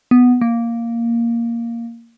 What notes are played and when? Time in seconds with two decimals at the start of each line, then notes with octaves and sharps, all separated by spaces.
0.11 B3
0.41 A#3